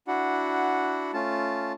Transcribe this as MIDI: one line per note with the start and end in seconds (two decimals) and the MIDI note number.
0.07 1.11 62
0.07 1.11 64
0.07 1.11 66
0.07 1.11 78
1.13 1.72 57
1.13 1.72 61
1.13 1.72 65
1.13 1.72 81